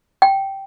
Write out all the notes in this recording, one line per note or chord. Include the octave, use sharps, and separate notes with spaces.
G5